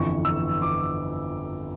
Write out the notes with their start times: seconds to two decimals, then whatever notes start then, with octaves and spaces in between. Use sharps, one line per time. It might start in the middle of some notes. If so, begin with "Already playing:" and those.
Already playing: G1 F2 E3 C#6
0.25 E6
0.62 D6